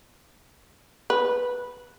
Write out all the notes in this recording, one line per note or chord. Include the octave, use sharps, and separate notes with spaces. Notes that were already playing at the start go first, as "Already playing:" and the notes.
B4